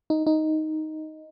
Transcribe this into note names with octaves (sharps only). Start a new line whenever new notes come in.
D#4
D#4